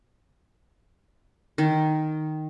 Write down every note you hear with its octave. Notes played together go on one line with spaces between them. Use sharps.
D#3